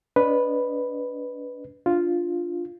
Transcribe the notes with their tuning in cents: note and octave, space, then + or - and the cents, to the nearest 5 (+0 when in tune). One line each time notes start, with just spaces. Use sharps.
D4 -35 B4 +0 D#5 -30
D4 +0 F4 +0